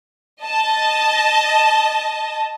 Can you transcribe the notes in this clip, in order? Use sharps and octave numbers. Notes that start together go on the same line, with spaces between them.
D#5 A5